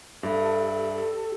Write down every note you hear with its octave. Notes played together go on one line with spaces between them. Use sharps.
G2 G4 A4 E5